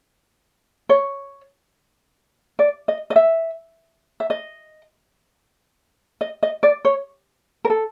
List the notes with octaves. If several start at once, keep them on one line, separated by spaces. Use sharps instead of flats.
C#5
D5
D#5
D#5
E5
E5
D#5
D#5
D#5
D5
C#5
A#4
A4